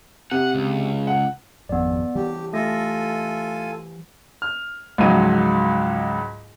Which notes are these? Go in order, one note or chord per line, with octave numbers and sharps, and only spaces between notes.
C3 F#5
C#2
F#5
G#1 F2 B3 D5
E3 G3 G4
A3 F4 A4 G#5 A#6
F6
C#2 G#2 F3 F#3 D#7